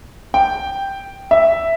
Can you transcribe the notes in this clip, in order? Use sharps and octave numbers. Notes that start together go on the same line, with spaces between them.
G5
E5